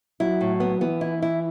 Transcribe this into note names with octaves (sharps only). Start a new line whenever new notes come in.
F#3 E4
A2
B3
E3 B3
E4
E4